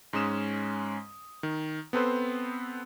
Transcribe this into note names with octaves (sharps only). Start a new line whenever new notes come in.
G#2 G#3 C#4 D#6 E7
D#3
B3 C4 A4 B4 C5